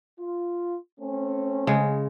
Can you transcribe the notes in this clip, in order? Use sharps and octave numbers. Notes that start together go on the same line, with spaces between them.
F4
A3 C4 C#4
C#3 G#3